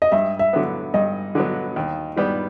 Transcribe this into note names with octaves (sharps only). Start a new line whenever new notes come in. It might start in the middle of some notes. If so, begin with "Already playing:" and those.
D#5
G2 E5
E5
D3 F#3 B3
G2 D#5
D3 F#3 B3
D#2
D#3 G3 B3